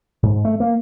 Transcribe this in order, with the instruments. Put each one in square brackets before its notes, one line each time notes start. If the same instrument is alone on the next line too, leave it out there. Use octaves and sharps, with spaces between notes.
[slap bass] G#2
A3
A#3